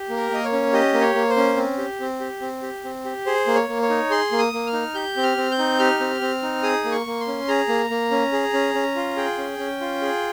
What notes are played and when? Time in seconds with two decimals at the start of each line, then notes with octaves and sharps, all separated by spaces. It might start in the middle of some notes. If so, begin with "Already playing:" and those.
Already playing: G4
0.09 A#3
0.16 A#4
0.31 A#3 D#5
0.44 C#5
0.52 C#4
0.73 G4 D#5
0.94 A#3
1.00 C#5
1.15 A#3
1.30 C5
1.37 C#4
1.57 C4
1.78 G4
2.00 C4
2.20 G4
2.41 C4
2.62 G4
2.84 C4
3.05 G4
3.26 G#4 C5
3.47 A#3
3.55 C#5
3.69 A#3
3.82 C#5
3.90 D#4
4.10 G#4 C6
4.32 A#3
4.38 D#6
4.53 A#3
4.67 F6
4.73 D#4
4.94 G4 G6
5.16 C4
5.23 F6
5.37 C4
5.51 G6
5.59 D#4
5.79 G4 F6
6.00 C4
6.21 C4
6.43 D#4
6.63 G#4 D#6
6.85 A#3
6.91 C#6
7.06 A#3
7.20 C6
7.28 C#4
7.48 G#4 A#5
7.69 A#3
7.90 A#3
8.11 C#4
8.33 G#4
8.53 C#4
8.74 C#4
8.96 F4
9.17 G#4 G5
9.38 C#4
9.58 C#4
9.81 F4
10.02 G#4